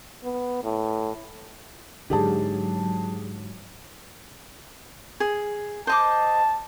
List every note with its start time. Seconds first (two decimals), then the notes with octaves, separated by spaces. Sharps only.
0.23 B3
0.63 A2
2.10 G#2 D3 F#3 G4 G#4 A5
5.20 G#4
5.87 C5 D#5 A5 D6